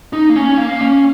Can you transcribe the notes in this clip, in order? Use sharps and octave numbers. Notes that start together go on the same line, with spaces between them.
D#4
A#3
C#4
A#3
C#4